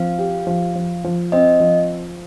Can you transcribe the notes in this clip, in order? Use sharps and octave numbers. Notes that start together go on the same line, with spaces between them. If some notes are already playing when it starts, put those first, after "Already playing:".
Already playing: F3 C4 F5
G4
F3
F3
F3
C4 D#5
F3